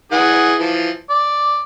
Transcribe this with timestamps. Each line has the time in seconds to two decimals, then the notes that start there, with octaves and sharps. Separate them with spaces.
0.12 E3 G#4 F#5
0.60 E3 F3
1.10 D5